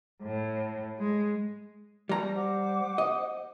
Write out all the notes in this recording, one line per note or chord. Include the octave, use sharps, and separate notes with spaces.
A2
G#3
G3 A#5
C5 F#5 D6
D#5